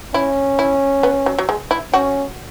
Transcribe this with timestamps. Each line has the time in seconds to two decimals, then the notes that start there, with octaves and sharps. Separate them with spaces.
0.14 C#4 E4
0.59 E4
1.03 B3
1.26 F#3
1.39 F#3
1.49 G#3
1.71 E4
1.93 C#4 F#4